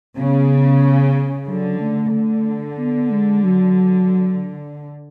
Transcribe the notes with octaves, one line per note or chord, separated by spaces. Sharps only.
C#3 B3
D3 F#3
A3
D3
B3
G#3
F#3